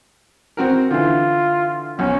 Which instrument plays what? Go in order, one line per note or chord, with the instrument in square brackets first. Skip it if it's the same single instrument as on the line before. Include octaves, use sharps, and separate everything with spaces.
[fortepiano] C4 F#4 A#4
[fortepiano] D3 E3 [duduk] F4
[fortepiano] B1 [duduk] C#4